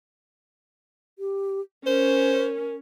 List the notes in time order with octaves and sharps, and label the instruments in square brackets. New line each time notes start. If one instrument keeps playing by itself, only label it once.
[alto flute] G4
[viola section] C#4 [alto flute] A#4 [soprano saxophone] C5